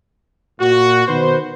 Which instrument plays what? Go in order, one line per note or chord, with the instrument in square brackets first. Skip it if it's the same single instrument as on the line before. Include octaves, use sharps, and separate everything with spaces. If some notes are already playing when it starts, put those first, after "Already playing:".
[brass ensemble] A#2 F#4
B2 D#3 F#4 B4 C5